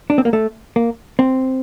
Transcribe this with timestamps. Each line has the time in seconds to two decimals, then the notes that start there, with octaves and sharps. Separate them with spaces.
0.10 D4
0.18 C4
0.25 A#3
0.33 A3
0.76 A#3
1.19 C4